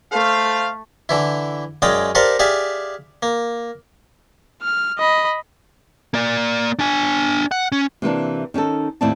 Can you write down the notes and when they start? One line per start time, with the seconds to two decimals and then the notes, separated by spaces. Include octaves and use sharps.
0.12 A3 C5 F5
1.09 D3 E3 E4
1.82 F#2 G#3 D5 D#5 F5 G5
2.15 G4 A4 A#4 C5 D5 F5
2.39 G4 G#4 D5 E5 F5
3.23 A#3
4.62 F6
4.98 D#5 B5
6.14 A#3 D5
6.79 D4 G#5
7.51 F#5
7.72 C#4
8.02 C3 E3 A#3 D4
8.54 D#3 C#4 D#4 A4
9.01 D#2 A2 C4 E4 D5 A5